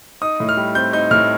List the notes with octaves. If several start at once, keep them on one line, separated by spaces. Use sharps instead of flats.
D#4 D#6
A2
F6
G3
C4 G6
D#4 G6
A2 F6